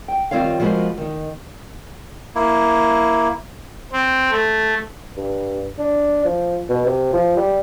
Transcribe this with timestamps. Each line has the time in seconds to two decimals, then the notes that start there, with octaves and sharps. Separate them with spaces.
0.08 G5
0.31 D#3 G3 C4 F4 C#5 F5
0.60 F3 G#3 B3 F#4 A#4 C5
0.98 D#3 D#4
2.35 A#3 E4
3.92 C4
4.31 A3
5.17 G2
5.79 D4
6.25 F3
6.70 B2
6.86 C3
7.13 F3
7.37 G3